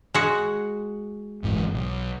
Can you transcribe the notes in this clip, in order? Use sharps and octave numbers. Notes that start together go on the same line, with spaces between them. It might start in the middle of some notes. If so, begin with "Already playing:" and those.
G#3 F#4
G1 G#2 E3
B1